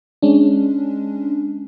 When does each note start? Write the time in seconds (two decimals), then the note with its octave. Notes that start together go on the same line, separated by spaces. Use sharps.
0.22 G#3 C#4 D4